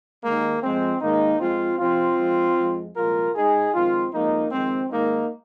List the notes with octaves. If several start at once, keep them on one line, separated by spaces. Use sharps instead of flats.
D#2 D#3 G#3 A#3
F2 F3 G#3 C4
G#2 D#3 G#3 A#3 D#4
F2 F3 G#3 C4 F4
F2 C3 F3 C4 F4
F2 F3 G#3
F2 F3 G#3
C2 A#2 F3 G#3 F4 A#4
G#2 G#3 D#4 G#4
F2 D#3 G#3 C4 F4
F2 F3 G#3 A#3 D#4
F2 D#3 G#3 C4
G#2 D#3 G#3 A#3 D#4